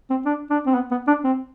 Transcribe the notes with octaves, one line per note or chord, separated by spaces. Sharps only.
C4
D4
D4
C4
B3
B3
D4
C4